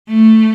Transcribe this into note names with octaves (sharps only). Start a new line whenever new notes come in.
A3